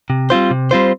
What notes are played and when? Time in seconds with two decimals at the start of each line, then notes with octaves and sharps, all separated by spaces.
0.10 C3
0.30 G3 C4 F4 C5
0.51 C3
0.71 G3 C4 F4 C5